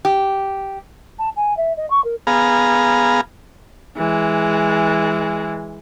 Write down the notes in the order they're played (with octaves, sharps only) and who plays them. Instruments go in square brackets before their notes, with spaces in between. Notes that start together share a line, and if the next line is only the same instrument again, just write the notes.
[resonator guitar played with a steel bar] G4
[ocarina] A5
G#5
E5
D#5
C#6
A#4
[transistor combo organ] B3 G#4 F5 A#5
[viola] E3 G#3